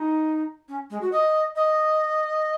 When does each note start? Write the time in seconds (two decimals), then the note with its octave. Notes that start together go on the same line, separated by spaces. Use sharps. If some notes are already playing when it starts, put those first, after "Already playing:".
Already playing: D#4
0.68 C#4
0.90 G#3
1.01 F#4
1.12 D#5
1.56 D#5